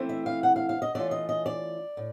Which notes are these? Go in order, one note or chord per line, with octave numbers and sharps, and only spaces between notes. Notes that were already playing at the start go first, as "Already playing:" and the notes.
Already playing: E3 A3 C4 E4
E5
F5
F#5
F5
F5
D#5
E3 A3 C#4 F4 D5
D#5
D#5
D5
A2